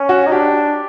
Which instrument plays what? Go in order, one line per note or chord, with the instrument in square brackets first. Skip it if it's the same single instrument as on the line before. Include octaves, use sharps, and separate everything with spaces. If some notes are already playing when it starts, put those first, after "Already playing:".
Already playing: [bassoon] C#4
[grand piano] F#4
[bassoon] D#4
[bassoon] D4 [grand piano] G4